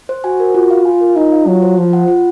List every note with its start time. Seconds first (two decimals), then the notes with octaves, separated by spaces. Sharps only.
0.09 C5
0.24 F#4 G#5
0.40 A#4
0.54 F4
0.71 F5
0.85 F4 G#5
1.01 A#4
1.16 D#4 F4
1.32 F5
1.46 F#3 F4
1.62 C5
1.77 F3 F4
1.93 F#5
2.08 F4